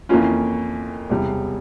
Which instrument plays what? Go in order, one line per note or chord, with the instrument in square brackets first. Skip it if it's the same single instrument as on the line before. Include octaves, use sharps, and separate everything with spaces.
[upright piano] F2 E3 A#3 C#4 F4
E1 E2 C3 G3